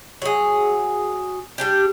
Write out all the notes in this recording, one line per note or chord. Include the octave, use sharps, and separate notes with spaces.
F#3 G#4
G3 D4 G4